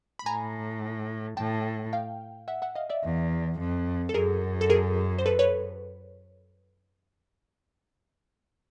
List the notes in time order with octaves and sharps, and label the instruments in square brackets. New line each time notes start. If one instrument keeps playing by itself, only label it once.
[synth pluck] B5
[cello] A2 [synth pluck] G#5 A#5
[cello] A2 [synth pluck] G5 A5
[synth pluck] F5 G5
E5 F#5
E5 F#5
D#5 F5
D5 E5
[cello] E2
F2
[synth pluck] A4
[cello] F#2 [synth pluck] G#4 A#4
[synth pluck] A4
G#4 A#4
C5
A4 B4
B4 C#5